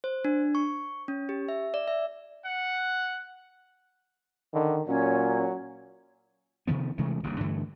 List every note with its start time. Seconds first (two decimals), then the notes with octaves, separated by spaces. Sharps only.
0.04 C5
0.25 D4
0.55 C#6
1.08 C#4
1.29 G4
1.48 E5
1.74 D5
1.87 E5
2.45 F#5
4.54 D3 D#3
4.88 A#2 F#3 C#4
6.67 C3 D#3 F3 B3
6.98 C3 E3 G#3 A3
7.23 G1 D#2 C#3
7.40 G2 D3 E3 A3